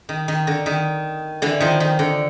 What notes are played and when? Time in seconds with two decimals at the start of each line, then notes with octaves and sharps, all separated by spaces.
0.09 D#3
0.28 D#3
0.47 D3
0.66 D#3
1.42 D3 E3
1.60 D#3 F3
1.80 D#3
1.99 D3